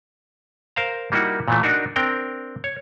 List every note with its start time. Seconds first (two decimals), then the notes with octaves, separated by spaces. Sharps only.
0.76 A#4 C5 F5 A#5
1.12 G3 A#3 D#4 E4 F#4
1.48 A#2 E3 A3
1.63 D4 D#4 F#4 A#4
1.96 C4 D4 A#4 G5
2.64 C#5